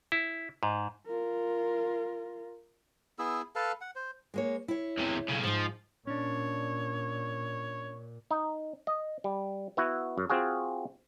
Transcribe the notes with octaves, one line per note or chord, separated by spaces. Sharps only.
E4
G#2
F4 A#4
B3 E4 G#4 E6
A4 B4 F5 A5
F#5
C5
G#3 A#3 C#5
E4 C#5
E2 C3
B1 C#3
G#2 F3 D#4
A#2 C#4 D4 C#5
D#4
D#5
G3
B3 E4 F#4
F#2
C4 F4 F#4 G#4